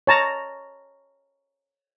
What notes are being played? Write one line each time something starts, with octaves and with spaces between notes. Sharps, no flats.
C#5 A5 A#5